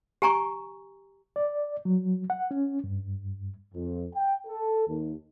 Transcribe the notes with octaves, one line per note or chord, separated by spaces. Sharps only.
G4 G#5 A#5 C#6
D5
F#3
F#5
C#4
G2
F2
G5
A4
D#2